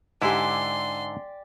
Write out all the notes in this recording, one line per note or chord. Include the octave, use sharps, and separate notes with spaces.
G#2 D3 E4 G4 D5 G#5 C6